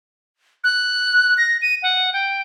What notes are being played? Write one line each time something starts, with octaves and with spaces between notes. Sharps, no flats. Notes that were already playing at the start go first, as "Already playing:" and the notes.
F#6
A#6
D#7
F#5
G5